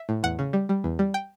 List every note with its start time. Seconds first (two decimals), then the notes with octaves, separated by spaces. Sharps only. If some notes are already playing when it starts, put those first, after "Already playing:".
Already playing: E5
0.09 A2
0.23 E2 F#5
0.39 C#3
0.53 G3
0.69 G3
0.84 E2
0.99 G3
1.14 G5